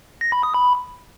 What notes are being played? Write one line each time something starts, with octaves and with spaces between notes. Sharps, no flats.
A#6
B5
D#6
B5